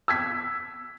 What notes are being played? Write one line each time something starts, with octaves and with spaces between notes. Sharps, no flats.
E6 G#6 B6